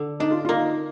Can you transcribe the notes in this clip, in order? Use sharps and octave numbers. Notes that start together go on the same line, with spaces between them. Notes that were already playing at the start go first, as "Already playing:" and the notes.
Already playing: D3
D4 D#4
F4
F4
A#3 D#4